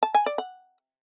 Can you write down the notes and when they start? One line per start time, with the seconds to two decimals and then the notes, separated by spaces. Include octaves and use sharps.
0.03 A5
0.15 G#5
0.26 D5
0.38 F#5